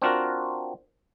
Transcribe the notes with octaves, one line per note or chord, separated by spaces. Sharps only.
C4 D4 F4 F#4 A#4